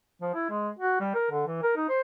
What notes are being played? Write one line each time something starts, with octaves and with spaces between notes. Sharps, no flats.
F3
E4
G#3
F#4
G3
A#4
D3
E3
A#4
D#4
C5